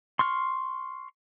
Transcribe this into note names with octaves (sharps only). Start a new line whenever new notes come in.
C6 C#6 F6